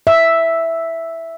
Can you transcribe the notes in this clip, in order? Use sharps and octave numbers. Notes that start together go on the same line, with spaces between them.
E5